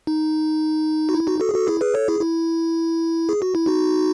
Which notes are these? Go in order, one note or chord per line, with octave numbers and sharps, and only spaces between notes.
D#4
F#4
E4
D#4 F#4
F#4 A4
G#4
F#4 A4
E4 G#4
G#4 B4
A4 C#5
E4 G#4
E4
G#4
F#4
E4
D#4 F#4